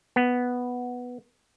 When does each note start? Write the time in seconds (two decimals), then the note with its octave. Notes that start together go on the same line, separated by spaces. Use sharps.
0.16 B3